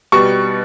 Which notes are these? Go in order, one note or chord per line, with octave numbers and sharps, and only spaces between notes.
B2 G3 C#6